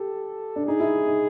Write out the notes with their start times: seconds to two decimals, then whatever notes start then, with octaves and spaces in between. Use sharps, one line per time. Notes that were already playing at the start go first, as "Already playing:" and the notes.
Already playing: G4 A4
0.56 D4
0.66 D#4 G#4
0.80 E4
1.07 D#4